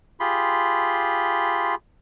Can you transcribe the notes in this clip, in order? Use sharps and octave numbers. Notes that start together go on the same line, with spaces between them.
F4 G4 G#4 B5 C6